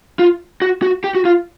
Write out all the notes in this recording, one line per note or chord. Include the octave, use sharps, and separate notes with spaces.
F4
F#4
F#4
G4
F#4
F4